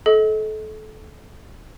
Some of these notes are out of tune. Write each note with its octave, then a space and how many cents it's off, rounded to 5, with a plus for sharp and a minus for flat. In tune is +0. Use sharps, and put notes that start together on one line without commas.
A4 -30 D#5 +30